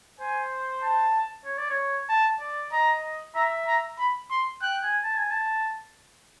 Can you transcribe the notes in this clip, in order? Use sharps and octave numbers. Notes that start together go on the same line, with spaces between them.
C5 G#5
A5
C#5
D5
C#5
A5
D5
D#5 A#5
E5 A#5
A#5
B5
C6
G5 F#6
G#5
A5
G#5
A5